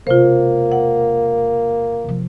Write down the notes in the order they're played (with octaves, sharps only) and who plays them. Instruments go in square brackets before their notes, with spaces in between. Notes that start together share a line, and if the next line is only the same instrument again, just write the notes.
[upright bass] E1 C3 [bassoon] A#3 [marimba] F4 C5
[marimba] F#5
[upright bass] C3 F3